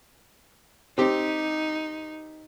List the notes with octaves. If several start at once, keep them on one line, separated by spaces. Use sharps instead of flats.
C4 D#4 G4